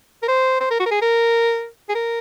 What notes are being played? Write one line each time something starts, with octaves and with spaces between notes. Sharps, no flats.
A#4
C5
C5
A#4
F#4
A#4
G#4
A#4
G#4
A#4